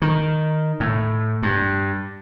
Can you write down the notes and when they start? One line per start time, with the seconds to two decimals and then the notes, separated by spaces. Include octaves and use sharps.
0.02 D#3
0.80 A2
1.43 G2